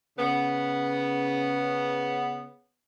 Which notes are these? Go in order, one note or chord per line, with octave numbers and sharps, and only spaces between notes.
C#3 B3